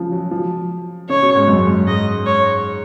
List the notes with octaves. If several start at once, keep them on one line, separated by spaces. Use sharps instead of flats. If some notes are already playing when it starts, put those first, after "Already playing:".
Already playing: C#3 F3
F#3
F3
C#3 C#5
B2
G#2
F#2
F#2
G#2 D#5
C#5